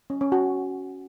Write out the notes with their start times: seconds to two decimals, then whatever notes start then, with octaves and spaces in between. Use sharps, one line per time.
0.10 C#4
0.21 C#4
0.32 F#4